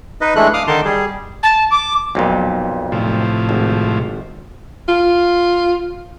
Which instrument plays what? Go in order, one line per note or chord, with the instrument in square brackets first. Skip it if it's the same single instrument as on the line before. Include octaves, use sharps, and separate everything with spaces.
[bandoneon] D#4 B4 D#5
E3 G#3 A3 D4 A4 F#6
F5 D6 D#6 F6
D3 D#3 D#4 A5 C6 D6
G3 G#4
[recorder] A5
D6
[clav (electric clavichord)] B1 F2 A#2
[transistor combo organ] A2 C3 F3
[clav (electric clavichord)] G#1
[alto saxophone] F4